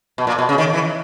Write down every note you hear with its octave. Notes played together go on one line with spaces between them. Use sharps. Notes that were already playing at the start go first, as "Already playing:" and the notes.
B2
A#2
B2
C#3
D#3
E3